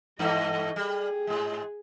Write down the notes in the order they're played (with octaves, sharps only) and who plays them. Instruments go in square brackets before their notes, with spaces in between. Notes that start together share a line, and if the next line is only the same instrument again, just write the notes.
[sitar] G2 E3 A3 [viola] D#5
[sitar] G3 [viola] G#4
[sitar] G#2 G#3